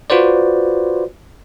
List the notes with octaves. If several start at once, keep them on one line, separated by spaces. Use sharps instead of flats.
F4 F#4 B4 C5 D5